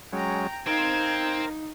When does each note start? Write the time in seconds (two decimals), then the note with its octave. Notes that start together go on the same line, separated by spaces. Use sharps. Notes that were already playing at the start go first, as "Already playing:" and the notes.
0.13 F#3 G#3 C#4 G5 A#5
0.67 D#4 A#4 C5 F5 G5 G#6